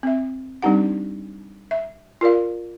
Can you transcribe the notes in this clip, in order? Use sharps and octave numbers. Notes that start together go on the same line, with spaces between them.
C4 E5
G3 C4 D4 D#4 G4 F#5
E5
F4 A#4 D5 F5